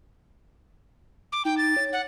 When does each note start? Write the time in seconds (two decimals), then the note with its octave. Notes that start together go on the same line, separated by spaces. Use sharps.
1.32 D6
1.45 D#4 G5
1.57 A6
1.77 C#5
1.93 F#5